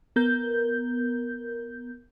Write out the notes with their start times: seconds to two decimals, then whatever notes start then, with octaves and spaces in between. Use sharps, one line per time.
0.16 B3 A#4 G6